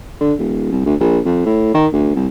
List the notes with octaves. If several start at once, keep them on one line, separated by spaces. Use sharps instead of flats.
D3
D#1
C2
D2
A#1
F2
A2
D#3
D2
C2